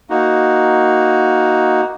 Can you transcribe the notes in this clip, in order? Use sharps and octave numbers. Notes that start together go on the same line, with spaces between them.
A#3 D#4 F#4